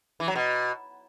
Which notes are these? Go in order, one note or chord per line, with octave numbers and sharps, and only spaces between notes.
E3
F#3
B2